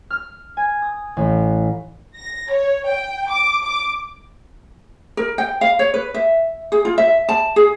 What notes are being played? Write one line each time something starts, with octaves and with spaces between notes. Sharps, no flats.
F6
G#5
D#6
A1
A#6
C#5
G5
D6
D6
A#4
G5
F5
C#5
B4
E5
G#4
F4
E5
A5
G#4